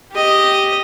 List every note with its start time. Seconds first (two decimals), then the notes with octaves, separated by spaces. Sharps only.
0.12 G4 D#5